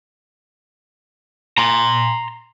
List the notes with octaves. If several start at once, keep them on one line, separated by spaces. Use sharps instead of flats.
A#5 C6